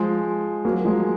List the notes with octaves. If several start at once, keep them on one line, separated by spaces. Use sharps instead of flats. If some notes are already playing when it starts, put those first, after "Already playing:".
Already playing: F3 G#3
F#3 A#3
F3 G#3